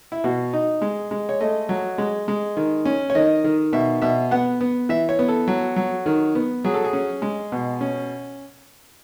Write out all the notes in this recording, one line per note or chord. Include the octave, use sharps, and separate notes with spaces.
E4
B2 F#4
D#4
G#3
G#3
C#5
A3 D#5
F#3
G#3
G#3
D#3
C#4
C#5
D#3 D#5
D#3
B2 E5
B2 E5
B3 F#5
B3
E3 E5
C#5
B3
A4
F#3
F#3
D#3
B3
F#3 G#4
A4
G#4
C#4
G#3
B2
C#4